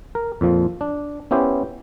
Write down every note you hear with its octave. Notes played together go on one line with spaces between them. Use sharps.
A#4
F2 A#2 F3
D4
B3 C#4 E4 G4 C5